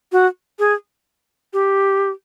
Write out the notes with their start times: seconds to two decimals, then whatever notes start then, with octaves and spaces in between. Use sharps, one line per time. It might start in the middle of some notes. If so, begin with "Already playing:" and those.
0.12 F#4
0.59 G#4
1.53 G4